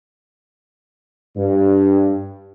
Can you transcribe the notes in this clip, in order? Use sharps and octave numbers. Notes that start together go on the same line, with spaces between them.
G2